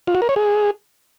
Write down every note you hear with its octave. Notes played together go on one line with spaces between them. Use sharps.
F4
F#4
A#4
C#5
G#4